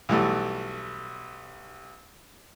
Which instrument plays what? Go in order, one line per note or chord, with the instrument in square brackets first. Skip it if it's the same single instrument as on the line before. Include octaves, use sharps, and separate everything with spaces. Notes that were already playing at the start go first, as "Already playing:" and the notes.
[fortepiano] B1 E3 G3 A3